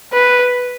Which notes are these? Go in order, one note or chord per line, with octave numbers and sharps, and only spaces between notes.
B4